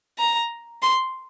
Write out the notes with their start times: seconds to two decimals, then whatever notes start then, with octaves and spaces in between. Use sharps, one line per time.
0.19 A#5
0.82 C6